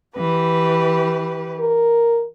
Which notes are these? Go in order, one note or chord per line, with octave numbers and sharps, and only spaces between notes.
E3 G4 B4
A#4